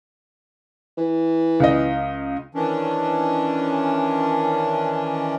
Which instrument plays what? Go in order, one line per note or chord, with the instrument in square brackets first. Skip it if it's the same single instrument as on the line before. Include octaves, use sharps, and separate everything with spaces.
[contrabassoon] E3
[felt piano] C#2 D#5
[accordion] D#3 E3 C#4 D4